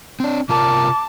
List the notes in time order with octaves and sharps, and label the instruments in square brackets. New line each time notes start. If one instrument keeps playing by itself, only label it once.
[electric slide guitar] C4 D4
[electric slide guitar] C3 F4 A#4 [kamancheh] A5 [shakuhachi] D6